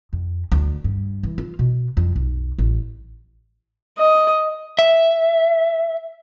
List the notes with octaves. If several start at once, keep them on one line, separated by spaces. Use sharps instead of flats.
F2
D2
G2
E3
F4
B2
F2
B1
A1
D#5
E5